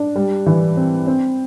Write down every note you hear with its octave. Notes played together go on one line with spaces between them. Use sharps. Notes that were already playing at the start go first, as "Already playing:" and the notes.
Already playing: D4
G3
E3
C4
C4